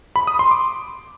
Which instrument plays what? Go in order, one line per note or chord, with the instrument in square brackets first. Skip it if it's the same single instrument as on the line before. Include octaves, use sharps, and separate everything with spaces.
[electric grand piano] B5
D#6
C6
D6